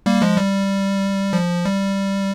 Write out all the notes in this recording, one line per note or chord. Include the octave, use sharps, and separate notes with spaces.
G3 A#3
F3 G#3
G3
F3
G3